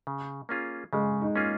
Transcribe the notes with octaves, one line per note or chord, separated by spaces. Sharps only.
C#3
A#3 C#4 F4 G#4
C#3 G#3
D#4
A#3 C#4 F4 G#4